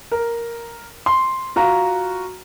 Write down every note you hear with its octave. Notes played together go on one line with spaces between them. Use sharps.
A#4
C6
F4 F#4 A#5